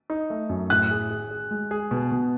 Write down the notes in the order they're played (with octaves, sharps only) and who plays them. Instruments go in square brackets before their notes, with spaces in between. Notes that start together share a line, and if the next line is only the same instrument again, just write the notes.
[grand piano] D#4
A3
F#2
[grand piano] A2 [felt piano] F#6
[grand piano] G#4
G#4
G#4
G#3
G#4
B2
B2